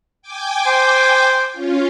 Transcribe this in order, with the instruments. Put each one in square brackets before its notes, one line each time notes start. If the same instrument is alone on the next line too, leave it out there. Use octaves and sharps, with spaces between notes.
[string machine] G5 G#5 D6
[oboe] C5
[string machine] C#4 F4